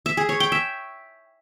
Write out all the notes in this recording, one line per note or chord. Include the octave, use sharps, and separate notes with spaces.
E5
G#4
C#5
G5
E5